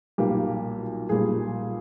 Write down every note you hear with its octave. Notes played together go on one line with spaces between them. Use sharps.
B1 A#2 G3 A#3 G4
B1 A#2 G3 A#3 G#4